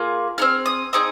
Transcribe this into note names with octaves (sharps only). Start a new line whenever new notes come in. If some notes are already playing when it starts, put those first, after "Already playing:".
Already playing: A#3 F4 G#4
C4 D#4 G#4 F6
D#6
C4 D#4 G#4 D#6